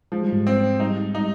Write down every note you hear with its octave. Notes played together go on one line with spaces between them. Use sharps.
F3 G#3
G3
G#2 G#3
C4
G3 D#4
G3 D#4